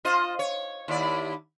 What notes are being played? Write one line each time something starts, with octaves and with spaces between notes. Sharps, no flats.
F4 C5 D#5
C#5
D#2 E4 D5